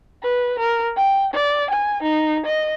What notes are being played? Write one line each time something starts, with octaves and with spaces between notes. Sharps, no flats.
B4
A#4
G5
D5
G#5
D#4
D#5